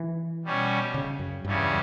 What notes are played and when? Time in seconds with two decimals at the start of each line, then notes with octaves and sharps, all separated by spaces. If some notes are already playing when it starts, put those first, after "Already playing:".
Already playing: E3
0.44 B2 G3 C#4
0.94 C#3
1.19 F#2
1.44 E2 G2 C#3 G3 C#4